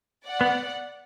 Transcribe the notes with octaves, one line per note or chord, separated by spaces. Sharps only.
D5 F#5
B3